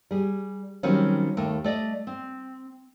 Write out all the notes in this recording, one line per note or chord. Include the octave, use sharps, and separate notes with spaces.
G3 G#4
D#3 F#3 G3 A#3 C4 C#4
D#2 A3 G5
A3 D5 D#5
C4